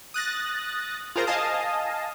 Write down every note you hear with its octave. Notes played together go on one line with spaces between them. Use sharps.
D#6 F#6 A6 A#6
F4 G#4 A#4 C5 A#5
D#5 F5 G#5 A5 D#6